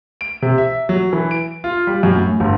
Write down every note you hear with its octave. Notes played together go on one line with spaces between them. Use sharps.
D7
C3
E5
F#3
E3
D7
F4
G3
F#2
A2
G1